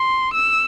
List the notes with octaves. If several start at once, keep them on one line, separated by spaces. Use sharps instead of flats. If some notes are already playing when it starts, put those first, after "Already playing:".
Already playing: C6
E6